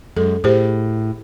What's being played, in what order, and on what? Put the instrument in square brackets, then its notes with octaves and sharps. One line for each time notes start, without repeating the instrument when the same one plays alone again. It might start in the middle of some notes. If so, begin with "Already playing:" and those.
[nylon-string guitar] F#2 G#3 [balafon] A4
[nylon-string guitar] A2 [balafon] G4 G#4 C5